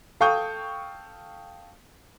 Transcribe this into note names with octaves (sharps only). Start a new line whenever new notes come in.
A4 F5 G5 C#6 D#6 G6